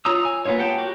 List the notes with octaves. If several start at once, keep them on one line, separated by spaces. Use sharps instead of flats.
F4 C#5 A#5 D#6 E6
G#5
A#3 B3 C#4 F4 C#5
G4 F#5 G5 A5
F#4 G4 A#4